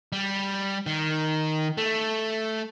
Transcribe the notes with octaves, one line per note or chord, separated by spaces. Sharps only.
G3
D#3
A3